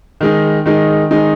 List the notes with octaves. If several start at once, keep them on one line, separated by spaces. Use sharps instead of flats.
D#3 G#3 D#4
D#3 G#3 D#4
D#3 G#3 D#4